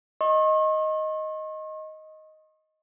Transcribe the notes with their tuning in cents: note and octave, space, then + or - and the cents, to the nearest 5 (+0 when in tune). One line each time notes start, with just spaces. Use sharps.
D#5 +5 C#6 -45